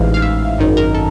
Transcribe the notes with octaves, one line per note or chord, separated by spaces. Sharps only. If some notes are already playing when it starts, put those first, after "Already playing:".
Already playing: A1 G#2 E3 F5
F5
E5
G#1 F#2 D#3
A#4
A4